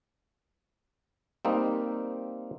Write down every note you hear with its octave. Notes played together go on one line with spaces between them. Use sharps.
G3 A#3 C4 D#4